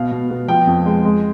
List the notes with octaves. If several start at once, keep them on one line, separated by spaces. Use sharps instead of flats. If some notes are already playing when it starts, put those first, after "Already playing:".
Already playing: B2 F5
B2
B3
F3 G5
F2
G#3
G#3